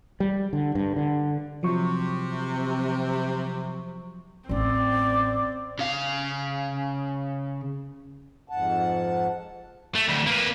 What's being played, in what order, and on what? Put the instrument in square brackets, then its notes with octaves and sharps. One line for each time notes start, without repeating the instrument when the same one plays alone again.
[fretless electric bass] G3
D3
G2
D3
[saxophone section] C3 [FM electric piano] F3 F#3 C#6
[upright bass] A1 C#4 [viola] C4 [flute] D5
[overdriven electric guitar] C#3 F5
[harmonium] F2 G#2 F#5 A5
[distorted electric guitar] A3
D2 A2
A#3 B4